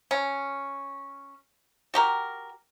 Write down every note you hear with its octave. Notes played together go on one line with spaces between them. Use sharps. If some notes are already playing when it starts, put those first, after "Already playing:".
C#4
F#4 G4 A#4